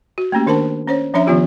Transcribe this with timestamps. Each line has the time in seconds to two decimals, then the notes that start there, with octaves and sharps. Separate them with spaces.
0.18 F#4
0.32 A3 A#3 C#4 G4
0.47 D#3 D4 A#4 C5 A5
0.88 C#4 C5 C#5
1.14 F3 C#4 D4 C#5 E5 A#5
1.27 D#3 F3 B3 F4 G4